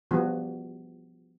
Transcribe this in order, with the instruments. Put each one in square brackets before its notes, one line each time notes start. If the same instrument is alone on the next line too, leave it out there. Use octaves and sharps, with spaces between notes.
[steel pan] F3 G3 B3 F#4